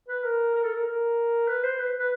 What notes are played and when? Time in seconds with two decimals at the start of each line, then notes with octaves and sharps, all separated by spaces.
0.08 B4
0.24 A#4
0.55 A#4
0.63 A4
0.74 A#4
0.86 A#4
1.48 B4
1.63 C5
1.79 B4
1.99 B4